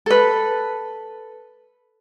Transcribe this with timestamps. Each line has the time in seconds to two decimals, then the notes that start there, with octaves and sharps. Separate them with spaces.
0.06 A4 B4